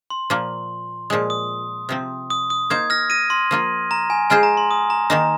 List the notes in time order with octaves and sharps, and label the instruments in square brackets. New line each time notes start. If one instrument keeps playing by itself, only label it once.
[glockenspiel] C6
[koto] A#2 F3 A#3
[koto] A#2 F3 G#3 [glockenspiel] D#6
[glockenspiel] D#6
[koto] C3 F3 C4
[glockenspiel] D#6
D#6
[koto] A#3 D#4 C5 [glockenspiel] D#6 G#6
[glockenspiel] F6 A#6
A#6 D#7
C6
[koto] F3 A#3 F4
[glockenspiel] A#5
G#5
[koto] G#3 F4 G#4 C5 [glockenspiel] G#5
[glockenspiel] A#5
C6
D#6
A#5
[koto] D#3 A#3 D#4 [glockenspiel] A#5